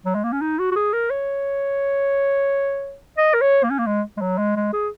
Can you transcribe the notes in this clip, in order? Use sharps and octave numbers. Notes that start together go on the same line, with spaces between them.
F#3
G#3
A#3
C#4
D#4
F#4
F#4
G#4
A#4
C#5
D#5
A#4
C#5
A#3
C#4
A#3
G#3
G#3
F#3
G#3
G#3
G#4